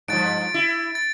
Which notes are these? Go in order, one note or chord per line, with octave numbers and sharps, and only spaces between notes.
G2 F3 A6 D7
E4
A6